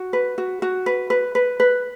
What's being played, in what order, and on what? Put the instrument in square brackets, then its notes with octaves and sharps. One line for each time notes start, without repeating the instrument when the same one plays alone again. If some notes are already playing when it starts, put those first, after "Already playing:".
Already playing: [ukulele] F#4
B4
F#4
F#4
B4
B4
B4
B4